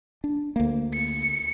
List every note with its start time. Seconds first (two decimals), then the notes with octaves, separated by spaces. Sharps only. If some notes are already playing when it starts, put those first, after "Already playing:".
0.24 D4
0.56 D2 A#3
0.94 C#7